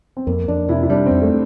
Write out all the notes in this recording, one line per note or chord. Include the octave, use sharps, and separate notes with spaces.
C4
F2 A#3
F2 D4
C3 E4
E4
G3 D4
F2 C4
A3